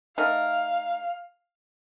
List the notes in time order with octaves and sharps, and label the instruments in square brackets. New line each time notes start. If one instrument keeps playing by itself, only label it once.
[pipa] A3 D#4 A#4 [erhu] F5